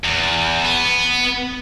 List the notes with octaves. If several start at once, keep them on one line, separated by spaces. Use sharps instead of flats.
E2
B3